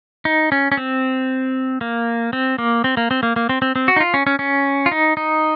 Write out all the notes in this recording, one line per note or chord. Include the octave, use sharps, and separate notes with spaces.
D#4
C#4
C#4
C4
A#3
C4
A#3
C4
A#3
C4
A#3
A#3
C4
C4
C4
F#4
D#4
F4
C#4
C#4
C#4
F4
D#4
D#4